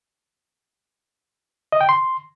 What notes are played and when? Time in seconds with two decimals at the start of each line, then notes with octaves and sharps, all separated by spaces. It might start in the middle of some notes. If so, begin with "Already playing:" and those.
1.72 D#5
1.81 G5
1.89 C6